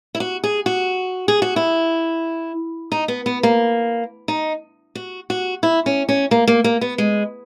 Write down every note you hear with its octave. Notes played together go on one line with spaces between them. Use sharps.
E4
F#4
G#4
F#4
G#4
F#4
E4
D#4
B3
B3
A#3
D#4
F#4
F#4
E4
C#4
C#4
A#3
A#3
A#3
B3
G#3